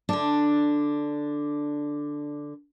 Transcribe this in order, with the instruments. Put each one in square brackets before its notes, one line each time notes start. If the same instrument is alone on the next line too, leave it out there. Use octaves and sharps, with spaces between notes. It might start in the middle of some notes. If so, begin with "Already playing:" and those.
[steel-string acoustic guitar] D3 D4